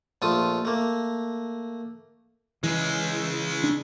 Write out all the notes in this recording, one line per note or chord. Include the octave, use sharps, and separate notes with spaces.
A#1 A3 F4 A5 D#6
A3 A#3
C#3 E3 G#3
D4